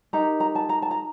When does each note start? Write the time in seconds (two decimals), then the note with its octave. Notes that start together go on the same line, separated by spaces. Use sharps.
0.13 D#4 G4 A#4 A#5
0.40 A#5
0.55 A5
0.69 A#5
0.82 A5
0.91 A#5